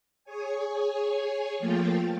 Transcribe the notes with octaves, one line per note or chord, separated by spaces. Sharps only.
G#4 C#5 G#5
F3 A3 A#3 F4 G5 A6